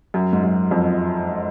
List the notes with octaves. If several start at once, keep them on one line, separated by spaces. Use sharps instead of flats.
F#2
G#2
F#2
F2